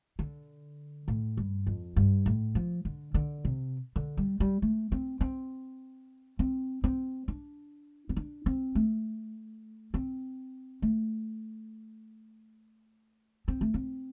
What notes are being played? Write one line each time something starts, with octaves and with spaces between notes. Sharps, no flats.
D3
A2
G2
F2
G2
A2
F3
D3
D3
C3
D3
G3
G3
A3
C4
C4
C4
C4
D4
C4
D4
C4
A3
C4
A3
C4
A3
C4